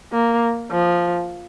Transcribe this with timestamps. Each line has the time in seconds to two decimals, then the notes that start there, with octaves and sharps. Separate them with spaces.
0.12 A#3
0.71 F3